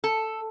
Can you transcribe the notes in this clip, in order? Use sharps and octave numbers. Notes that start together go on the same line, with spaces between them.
A4